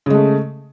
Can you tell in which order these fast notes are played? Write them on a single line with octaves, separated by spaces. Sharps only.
C#3 G#3 A3